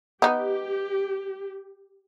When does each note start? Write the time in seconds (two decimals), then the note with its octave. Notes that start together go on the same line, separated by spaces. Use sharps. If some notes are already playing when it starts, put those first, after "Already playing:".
0.22 B3 D#4 G4